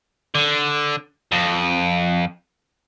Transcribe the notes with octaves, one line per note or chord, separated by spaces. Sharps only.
D3
F2